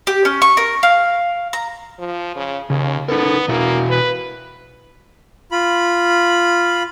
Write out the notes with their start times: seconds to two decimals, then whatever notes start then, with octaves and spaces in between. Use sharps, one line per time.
0.07 G4
0.25 C#4
0.42 C#6
0.57 A#4
0.83 F5
1.53 A#5
1.99 F3
2.36 C#3
2.70 D#2 C#3
3.08 B3 D#4 A4 A#4
3.48 B2 A#3 E4 F#4
3.90 B4
5.51 F4 B5